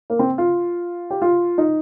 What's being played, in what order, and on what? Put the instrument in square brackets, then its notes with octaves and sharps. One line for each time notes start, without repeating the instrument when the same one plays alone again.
[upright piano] A#3
C4
F4
G4
F4
D#4